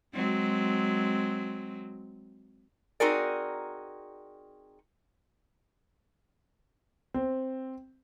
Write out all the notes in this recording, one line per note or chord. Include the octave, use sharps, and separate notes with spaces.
F#3 G#3 C4
C4 D#4 F#4 G#4 A#4 D5
C4